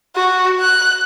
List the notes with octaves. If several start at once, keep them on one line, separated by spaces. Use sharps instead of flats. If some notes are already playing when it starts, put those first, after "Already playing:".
F#4
F#6